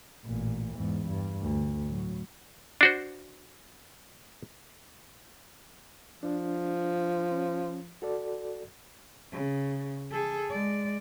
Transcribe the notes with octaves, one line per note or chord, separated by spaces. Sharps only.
A1 A#2
E2 G#2
G2
D2
A2 F#3
D4 F#4 C5
F3 D4
C#4
F#4 A4 D5
C#3
G#4 A4
G#3 D5